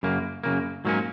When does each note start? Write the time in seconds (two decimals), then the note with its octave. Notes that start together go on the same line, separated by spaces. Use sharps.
0.03 F#2 C#3 A#3
0.44 F#2 C#3 A#3
0.85 G#2 F#3 A#3 C#4